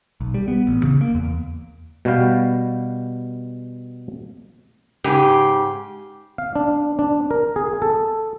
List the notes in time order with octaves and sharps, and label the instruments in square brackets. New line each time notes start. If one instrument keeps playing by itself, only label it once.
[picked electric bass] B1
G3
B3
A1
C#3
A#3
E2
[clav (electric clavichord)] B2 G3 F#4 B4 F5 G5
[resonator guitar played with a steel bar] G#2 C#3 G4 G#5
[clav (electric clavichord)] F5
D4
D4
A#4
G#4
A4